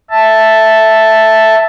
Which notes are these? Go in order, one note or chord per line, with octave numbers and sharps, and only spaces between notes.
E5 A5